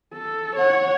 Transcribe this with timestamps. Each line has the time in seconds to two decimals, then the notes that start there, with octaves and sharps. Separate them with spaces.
0.14 A4
0.56 C#5 F#5